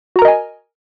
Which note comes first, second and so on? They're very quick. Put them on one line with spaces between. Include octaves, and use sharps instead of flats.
F#4 A#5 A#4 D#5 G#5